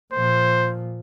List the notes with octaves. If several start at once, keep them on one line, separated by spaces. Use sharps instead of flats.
A#2 F3 C5